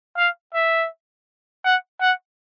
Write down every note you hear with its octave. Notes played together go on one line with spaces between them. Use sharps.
F5
E5
F#5
F#5